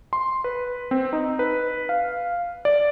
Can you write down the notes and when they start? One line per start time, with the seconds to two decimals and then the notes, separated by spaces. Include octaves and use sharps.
0.13 C6
0.44 B4
0.91 C4
1.13 D#4
1.39 B4
1.89 F5
2.65 D5